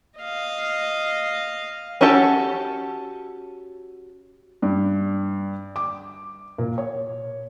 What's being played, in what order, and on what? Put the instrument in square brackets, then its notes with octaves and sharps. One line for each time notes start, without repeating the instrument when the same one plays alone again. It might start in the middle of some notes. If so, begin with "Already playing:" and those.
[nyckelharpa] D#5 F5
[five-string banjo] C#4 F#4 G4 A4 A5
[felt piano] G2
D6
A#2
C#5